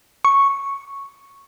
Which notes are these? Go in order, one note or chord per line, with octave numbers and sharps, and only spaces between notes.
C#6